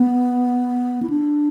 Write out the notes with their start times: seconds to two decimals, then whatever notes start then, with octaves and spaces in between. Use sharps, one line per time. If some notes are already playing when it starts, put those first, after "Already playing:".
Already playing: B3
1.03 E4
1.10 D4